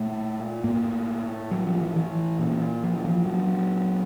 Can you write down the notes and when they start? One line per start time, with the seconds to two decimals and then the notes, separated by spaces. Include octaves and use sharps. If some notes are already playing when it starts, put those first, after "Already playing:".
Already playing: A#2 A3
0.64 A2 A#3
1.51 F#3
1.67 F3
1.81 E3
1.96 E3
2.39 A#2
2.84 F3
2.97 E3
3.05 F3
3.27 F#3